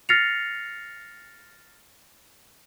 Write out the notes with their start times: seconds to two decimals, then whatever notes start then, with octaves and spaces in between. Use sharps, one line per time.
0.09 F6 A6 A#6 C7 C#7 F7